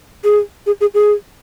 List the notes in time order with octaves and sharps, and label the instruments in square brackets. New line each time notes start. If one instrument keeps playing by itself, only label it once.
[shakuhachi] G#4
G#4
G#4
G#4